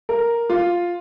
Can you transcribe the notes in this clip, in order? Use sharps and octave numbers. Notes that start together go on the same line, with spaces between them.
A#4
F4